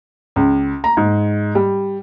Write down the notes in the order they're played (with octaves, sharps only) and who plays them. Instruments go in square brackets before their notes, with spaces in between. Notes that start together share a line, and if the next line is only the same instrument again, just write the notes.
[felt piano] C#2
A#5
G#2
G3